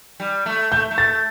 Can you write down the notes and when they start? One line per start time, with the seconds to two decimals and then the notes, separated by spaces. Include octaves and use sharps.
0.20 G3
0.46 A3
0.72 A3 G6
0.91 A3
0.98 A6